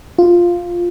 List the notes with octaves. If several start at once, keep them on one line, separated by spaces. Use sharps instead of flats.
F4